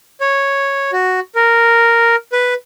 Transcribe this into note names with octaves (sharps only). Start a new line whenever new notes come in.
C#5
F#4
A#4
B4